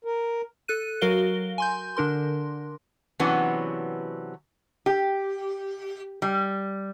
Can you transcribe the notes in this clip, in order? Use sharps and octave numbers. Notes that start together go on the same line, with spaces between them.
A#4
A4 F#6 D#7
F#3 F#4 A#4 F5 G7
G#5 C6 G6
D3 D4 A#4 C6
C3 E3 F#3 B3 C#4 D4
G4
G3